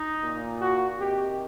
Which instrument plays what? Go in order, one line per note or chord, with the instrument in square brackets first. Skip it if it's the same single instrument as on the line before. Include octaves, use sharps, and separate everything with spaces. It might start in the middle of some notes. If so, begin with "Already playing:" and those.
Already playing: [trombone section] D#4
A#2
F#4
C3 D#3 G4